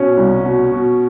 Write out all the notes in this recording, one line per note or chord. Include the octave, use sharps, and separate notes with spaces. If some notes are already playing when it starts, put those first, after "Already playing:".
Already playing: B2 C#4
C2
B2
B2